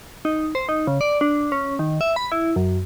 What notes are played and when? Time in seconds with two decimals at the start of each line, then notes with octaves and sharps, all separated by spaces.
0.25 D#4
0.55 C5
0.69 D#4
0.87 C#3
1.01 D5
1.21 D4
1.52 C#4
1.79 D#3
2.01 E5
2.16 B5
2.32 E4
2.56 F#2